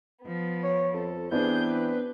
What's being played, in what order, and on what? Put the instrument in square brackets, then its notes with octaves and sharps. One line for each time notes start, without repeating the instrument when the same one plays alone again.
[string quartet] F3 B3
[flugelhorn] C#5
[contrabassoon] F2 [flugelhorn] A4
[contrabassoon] E3 [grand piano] B3 C4 D4 [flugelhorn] G4 [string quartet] G#4 G6
[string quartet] B4